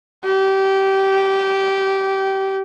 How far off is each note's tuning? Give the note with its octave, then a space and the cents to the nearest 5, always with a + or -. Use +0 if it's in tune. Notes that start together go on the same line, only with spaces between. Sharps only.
G4 -20